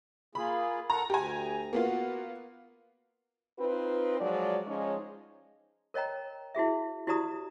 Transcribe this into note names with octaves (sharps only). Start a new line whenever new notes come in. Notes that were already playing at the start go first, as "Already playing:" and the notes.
A#3 F4 G#4 B5
A4 A#4 F#5 A#5
D2 G4 G#5 A#5
A#3 B3 F4 F#4
C4 D#4 F4 B4
F3 F#3 G#3 D5
F3 G#3 C#4 D#4 C#5
A#4 C#5 D#5 G5 A#5
E4 F#4 G#4 E5
E4 F#4 G4 D5 A#5 D#6